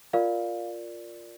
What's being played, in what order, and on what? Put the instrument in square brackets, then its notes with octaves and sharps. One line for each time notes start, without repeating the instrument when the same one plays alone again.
[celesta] F4 A#4 D5 F5